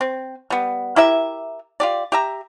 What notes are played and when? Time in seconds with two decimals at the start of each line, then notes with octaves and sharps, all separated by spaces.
0.01 C4
0.50 G3 B3
0.96 E4 G4 A#4 E5
1.80 F4 G4 D5
2.12 G4 E5 A#5